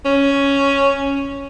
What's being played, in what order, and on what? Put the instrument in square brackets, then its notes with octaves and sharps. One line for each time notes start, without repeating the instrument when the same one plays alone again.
[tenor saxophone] C#4